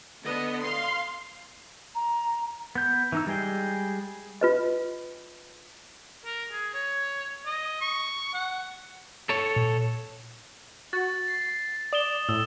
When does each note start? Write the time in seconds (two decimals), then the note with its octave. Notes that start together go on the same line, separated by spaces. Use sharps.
0.23 D3 B3 D#5
0.62 F5 C6
1.95 A#5
2.75 B3 G6
3.12 E3 D#4 E6
3.27 G3 G#3 G#4 G5
4.41 F4 B4 D#5
6.25 A#4
6.51 G#4
6.74 C#5
7.46 D#5
7.81 C#6
8.34 F#5
9.29 A4 C#5
9.56 A#2
10.93 F#4 A6
11.28 C7
11.93 D5 D#6 E7 G7
12.29 A2 E6